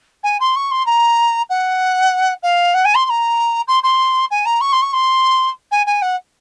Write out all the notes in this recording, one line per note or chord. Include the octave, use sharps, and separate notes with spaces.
G#5
C6
C#6
C6
A#5
F#5
F5
F#5
G#5
C6
C6
A#5
C6
C6
G#5
A#5
C#6
C6
C#6
C6
G#5
G#5
F#5